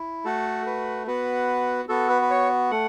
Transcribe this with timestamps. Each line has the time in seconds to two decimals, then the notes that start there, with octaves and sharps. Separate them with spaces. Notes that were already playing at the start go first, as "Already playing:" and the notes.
Already playing: E4
0.25 A3 F#4 A4
0.66 B4
1.07 B3 F#4 B4
1.89 B3 F#4 A4
2.10 B4
2.22 B4
2.30 C#5
2.71 A3 F#5